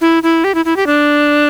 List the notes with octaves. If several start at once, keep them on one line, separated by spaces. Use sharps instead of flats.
E4
E4
G4
E4
E4
G4
D4